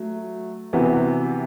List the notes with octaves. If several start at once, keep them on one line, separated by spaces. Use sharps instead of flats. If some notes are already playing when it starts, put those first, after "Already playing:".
Already playing: F#3 A3
C3 E3 B3 F#4